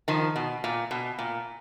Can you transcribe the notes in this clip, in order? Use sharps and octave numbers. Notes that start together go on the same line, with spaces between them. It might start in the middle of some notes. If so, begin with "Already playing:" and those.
D#3 F3
B2
A#2
B2
A#2